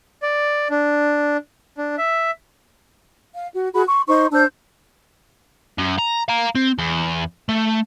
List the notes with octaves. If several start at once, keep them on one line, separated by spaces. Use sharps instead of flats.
D5
D4
D4
E5
F5
F#4
F#4 G#4 B5
C6 C#6
D#4 C5 C6 C#6
D4 C5 E6 G6
F#2
A#5
F5 A#5
C4
E2
A3